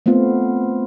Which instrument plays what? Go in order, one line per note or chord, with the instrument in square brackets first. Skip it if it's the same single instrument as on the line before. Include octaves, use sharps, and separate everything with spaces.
[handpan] A3 B3 C4 F4